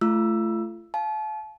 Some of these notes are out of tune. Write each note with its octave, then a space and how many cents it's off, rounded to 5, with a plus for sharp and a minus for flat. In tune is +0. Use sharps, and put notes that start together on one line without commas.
A3 -10 F4 -35 E6 +10
F5 +0 A5 -35